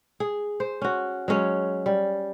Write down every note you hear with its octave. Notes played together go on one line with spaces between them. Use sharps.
G#4
C5
C#4 F#4
F#3 G#3 C#4
G3